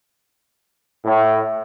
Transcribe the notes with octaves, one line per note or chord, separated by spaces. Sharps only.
A2